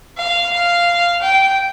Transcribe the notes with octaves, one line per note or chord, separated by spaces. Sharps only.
F5
F5
G5